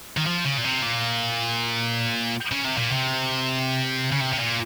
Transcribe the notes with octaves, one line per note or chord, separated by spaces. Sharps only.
D#3
F3
C#3
A#2
C3
A#2
C#3
C3
A#2
C3
C#3
C3
C3
A#2